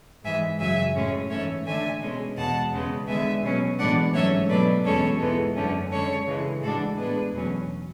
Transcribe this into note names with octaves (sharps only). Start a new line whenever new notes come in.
G#2 E3 G#3 E5 G#5
F#2 C#3 F#3 E5 G#5
A2 G#3 C#4
G#2 E3 A3 C#4 C#5 E5
D3 A3 D4 E5 G#5
B2 G#3 C#4
E2 B2 G#3 F#5 A5
E2 C#3 G#3 B3
D3 G#3 B3 E5 G#5
B2 F#3 C#4
A2 E3 G#3 B3 D4 D5 F#5
G#2 F#3 A3 C#4 C#5 E5
B2 F#3 A3 D4 B4 D5
E2 B2 G#3 C#4 A4 C#5
G#2 E3 G#3 B3
F#2 D3 A3 C#4
D3 G#3 C#4 A4 C#5
C#3 E3 G#3
A2 E3 G#3 D4 F#4 A4
A2 G#3 B3 D4 G#4 B4
E2 B2 F#3 C#4